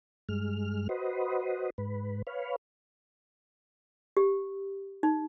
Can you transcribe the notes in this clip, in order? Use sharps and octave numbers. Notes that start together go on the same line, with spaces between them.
G2 G#3 F6
F#4 B4 C5 D#5
G#2 B4
B4 C#5 F5
G4
D#4